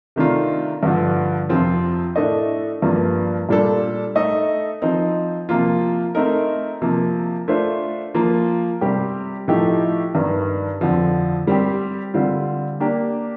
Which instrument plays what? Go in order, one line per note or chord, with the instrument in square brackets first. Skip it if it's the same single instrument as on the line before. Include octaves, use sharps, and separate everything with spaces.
[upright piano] C3 D#3 A3 D4 F4
G2 D3 F3
F2 C3 F3 C4 F4
A2 A3 D4 A4 D#5
G2 F3 A#3
A#2 G3 D4 A4
A3 D#4 A4 D#5
F3 C4 D#4
C3 F3 A#3 F4
A3 C4 D#4 A#4
C3 F3 A#3
A3 D4 F4 C5
F3 A#3 F4
C3 G3 C4 G4
A2 F3 A3 D#4 G4
G2 D#3 G3
F2 D3 F3
G3 C4 G4
D3 G3 C4 F4
A#3 D4 G4